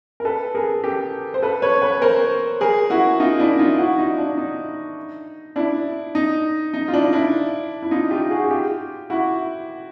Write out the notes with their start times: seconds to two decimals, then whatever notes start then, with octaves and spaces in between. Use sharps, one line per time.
0.20 A#4
0.25 A4 B4
0.55 G#4 A#4
0.84 G4 A4
1.34 C5
1.43 A4 B4
1.62 B4 C#5
1.82 B4 C#5
2.02 A#4 C5
2.61 G#4 A#4
2.90 E4 F#4
3.20 D#4 F4
3.40 D4 E4
3.59 D#4 F4
3.78 E4 F#4
3.98 D#4 F4
4.18 D4
4.38 D#4
5.56 D4 E4
6.15 D#4
6.74 D#4
6.88 F4
6.93 D4 E4
7.13 D4 E4
7.83 E4
7.91 D#4 F4
8.11 F4 G4
8.31 F#4 G#4
8.44 G#4
8.50 F4 G4
9.10 E4 F#4